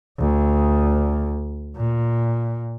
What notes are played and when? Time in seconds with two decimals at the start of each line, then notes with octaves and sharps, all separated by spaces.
0.19 D2
1.76 A#2